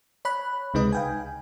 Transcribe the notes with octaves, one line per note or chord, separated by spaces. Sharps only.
C#5 B5 F#6
C#2 C3 G#3 D#4 B4 D#5
F5 G5 G#5